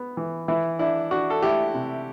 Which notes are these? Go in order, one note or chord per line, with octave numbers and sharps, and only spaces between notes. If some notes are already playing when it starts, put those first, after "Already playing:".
Already playing: B3
E3
E3 E4
D4 E4
D4 F#4
A4
A3 E4 G4
C3